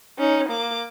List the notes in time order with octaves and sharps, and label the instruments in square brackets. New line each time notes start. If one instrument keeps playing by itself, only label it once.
[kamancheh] C#4 D#4
A#3 D6